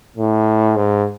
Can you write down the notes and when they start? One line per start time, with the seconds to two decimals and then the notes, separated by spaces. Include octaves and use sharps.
0.17 A2
0.76 G#2